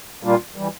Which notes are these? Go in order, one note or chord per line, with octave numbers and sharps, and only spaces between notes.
A#2 G3 A#3 D4 F4
E3 G3